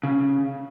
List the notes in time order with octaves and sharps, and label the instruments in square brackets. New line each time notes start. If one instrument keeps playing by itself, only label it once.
[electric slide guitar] C#3